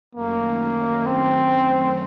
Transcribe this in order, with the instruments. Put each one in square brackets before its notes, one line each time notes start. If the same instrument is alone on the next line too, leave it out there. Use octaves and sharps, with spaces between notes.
[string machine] F#2 D#3 F#3 A3 C#4 [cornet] A#3
[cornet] C4